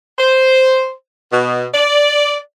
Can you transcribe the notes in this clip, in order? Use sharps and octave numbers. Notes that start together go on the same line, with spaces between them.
C5
B2
D5